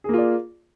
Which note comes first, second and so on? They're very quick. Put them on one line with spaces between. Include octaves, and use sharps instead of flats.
G#4 A#3 F4 D5